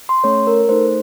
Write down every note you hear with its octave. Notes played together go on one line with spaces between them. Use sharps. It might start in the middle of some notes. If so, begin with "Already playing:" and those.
C6
A3 C#4 A4 C#5
A#4
A3 D#4 A4 C5